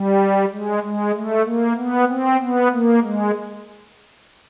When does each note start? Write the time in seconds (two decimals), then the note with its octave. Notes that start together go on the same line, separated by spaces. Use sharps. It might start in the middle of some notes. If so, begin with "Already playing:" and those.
Already playing: G3
0.52 G#3
0.83 G#3
1.14 A3
1.45 A#3
1.76 B3
2.09 C4
2.40 B3
2.72 A#3
3.03 G#3